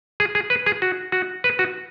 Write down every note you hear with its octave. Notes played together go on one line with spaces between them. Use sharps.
G#4
G#4
B4
G#4
F#4
F#4
B4
F#4